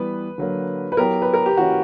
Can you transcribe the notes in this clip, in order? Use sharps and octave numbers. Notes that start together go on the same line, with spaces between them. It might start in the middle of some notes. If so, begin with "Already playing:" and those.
Already playing: E3 G3 B3 B4
D3 F#3 A#3
B4
F#3 B3 E4 G4 A#4
B4
A#4
G4
E3 A#3 C#4 E4 F#4